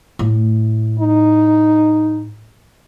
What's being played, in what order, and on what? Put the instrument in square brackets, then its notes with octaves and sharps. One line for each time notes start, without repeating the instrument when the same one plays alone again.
[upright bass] A2
[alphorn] D#4